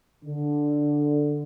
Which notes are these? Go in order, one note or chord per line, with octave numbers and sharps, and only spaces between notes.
D3